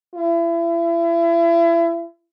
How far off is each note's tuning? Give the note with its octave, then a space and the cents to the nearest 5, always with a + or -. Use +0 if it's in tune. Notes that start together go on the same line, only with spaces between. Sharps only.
E4 +35